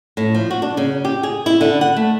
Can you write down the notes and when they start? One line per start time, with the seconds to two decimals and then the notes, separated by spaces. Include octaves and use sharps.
0.17 A2
0.35 F3
0.51 F#4
0.62 D4
0.77 C#3
1.05 G4
1.23 G#4
1.46 E4
1.61 D3
1.81 F#5
1.97 A3